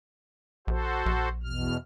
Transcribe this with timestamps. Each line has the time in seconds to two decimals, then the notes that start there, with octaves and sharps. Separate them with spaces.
0.67 A#1 F#4 A4 C5
1.06 A#1
1.43 E2 B2 F6